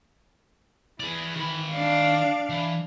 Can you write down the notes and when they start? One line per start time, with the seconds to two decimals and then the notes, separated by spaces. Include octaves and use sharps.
1.00 E3 G#4 D5
1.36 D#3 B5
1.71 D4 F5
2.50 E3